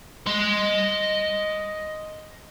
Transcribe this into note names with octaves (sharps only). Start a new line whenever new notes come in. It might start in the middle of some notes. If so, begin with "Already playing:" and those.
D#5 C6